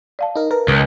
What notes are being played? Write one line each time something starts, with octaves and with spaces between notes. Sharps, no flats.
D5 F5 A5
D#4 A#4
A#4 B4
C#2